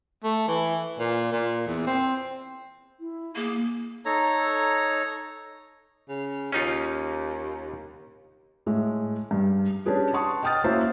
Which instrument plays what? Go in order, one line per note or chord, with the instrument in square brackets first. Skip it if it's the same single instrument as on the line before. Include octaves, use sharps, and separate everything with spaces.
[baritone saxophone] A3
E3
A#2
A#2
E2
C4
[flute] E4
[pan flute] A#3 [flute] G#4
[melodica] D#4 A4 C#5 A#5
[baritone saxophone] C#3
[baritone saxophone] D#2 [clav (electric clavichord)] C#4 D#4 F4
[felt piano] A2 G#3 E5
G2
C#4 D4 G4 G#4 B4
F#5 A5 C6 C#6 D#6
D#5 F#5 G5 D#6 F6 A6
A#3 C#4 E4 F#4 C5 E5